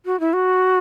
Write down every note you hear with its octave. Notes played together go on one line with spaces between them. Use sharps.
F#4
E4
F#4